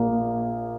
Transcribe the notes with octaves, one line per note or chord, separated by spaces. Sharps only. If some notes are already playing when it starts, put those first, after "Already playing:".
Already playing: A#1 A#2 A#3